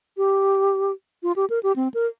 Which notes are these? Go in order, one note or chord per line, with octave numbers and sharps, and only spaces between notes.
G4
F4
G4
A#4
G4
C4
A#4